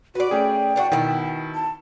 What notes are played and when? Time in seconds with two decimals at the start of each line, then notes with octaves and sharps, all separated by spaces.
0.15 F#4 B4 D5
0.31 A3 C#4 G#4 G5
0.76 E3 D4 F#4
0.92 B2 D#3 E4
1.55 A5